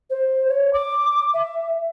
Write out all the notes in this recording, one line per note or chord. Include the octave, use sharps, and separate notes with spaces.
C5
C#5
D6
E5